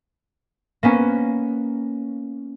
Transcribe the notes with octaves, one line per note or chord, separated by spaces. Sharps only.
A#3 B3 C#4